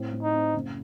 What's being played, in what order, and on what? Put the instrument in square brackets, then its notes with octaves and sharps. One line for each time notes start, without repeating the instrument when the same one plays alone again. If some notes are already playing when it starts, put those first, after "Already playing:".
Already playing: [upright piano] A2 C4
A2
[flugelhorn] D#4
[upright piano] C4
F#1